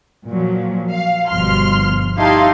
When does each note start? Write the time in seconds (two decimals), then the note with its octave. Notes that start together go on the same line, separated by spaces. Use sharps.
0.28 A#2 F3 F#3
0.91 F5
1.29 G1 B2 F3 C6 F6
2.19 D#4 E4 G4 F5 A5 C6